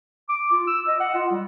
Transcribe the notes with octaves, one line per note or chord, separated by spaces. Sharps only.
D6
F4
E6
D#5
F#5
F4
G3